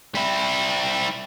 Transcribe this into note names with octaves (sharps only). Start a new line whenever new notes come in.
G3 E4